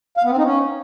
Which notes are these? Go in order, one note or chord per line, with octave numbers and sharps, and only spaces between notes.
F5
B3
C4
D#4
C#4